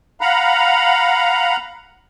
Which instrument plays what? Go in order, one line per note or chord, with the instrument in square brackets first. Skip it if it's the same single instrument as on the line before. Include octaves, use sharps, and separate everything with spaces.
[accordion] F5 F#5 A#5 B5